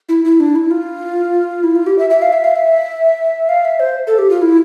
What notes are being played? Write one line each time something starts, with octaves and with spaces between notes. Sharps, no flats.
E4
E4
D4
E4
F4
E4
F4
G4
E5
E5
F5
E5
F5
E5
F5
E5
C5
A4
G4
F4
E4